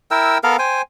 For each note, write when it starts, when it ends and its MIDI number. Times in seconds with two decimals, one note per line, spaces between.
0.11 0.38 64
0.11 0.38 70
0.11 0.38 79
0.11 0.38 88
0.44 0.57 59
0.44 0.57 69
0.44 0.57 70
0.44 0.57 77
0.59 0.82 72
0.59 0.82 79
0.59 0.82 80